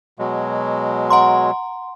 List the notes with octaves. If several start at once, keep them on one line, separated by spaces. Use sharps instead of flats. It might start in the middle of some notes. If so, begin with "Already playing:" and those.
B2 F#3 G#3
F#5 A#5 C6